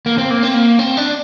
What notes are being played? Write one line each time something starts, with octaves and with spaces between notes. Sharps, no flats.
A#3
C4
A#3
C4
A#3
C4
D4